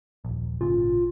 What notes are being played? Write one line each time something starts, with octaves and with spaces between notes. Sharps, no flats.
D#1 A#1
G#1 A#2 C#3 F4